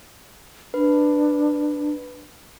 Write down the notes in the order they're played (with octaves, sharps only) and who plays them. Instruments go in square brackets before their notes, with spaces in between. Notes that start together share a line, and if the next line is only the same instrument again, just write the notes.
[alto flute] D4 [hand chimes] B4